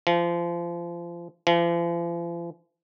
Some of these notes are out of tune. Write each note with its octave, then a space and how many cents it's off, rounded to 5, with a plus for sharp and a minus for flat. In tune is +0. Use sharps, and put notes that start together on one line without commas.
F3 -30
F3 -45